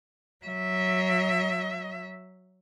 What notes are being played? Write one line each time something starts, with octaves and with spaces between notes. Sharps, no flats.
F#3 E5